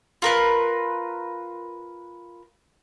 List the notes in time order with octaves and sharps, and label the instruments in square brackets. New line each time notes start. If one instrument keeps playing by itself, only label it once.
[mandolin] F4 A#4 B4